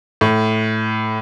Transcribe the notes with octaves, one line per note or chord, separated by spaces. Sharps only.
A2